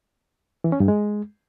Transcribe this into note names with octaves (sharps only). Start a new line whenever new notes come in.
E3
C#4
G2
G#3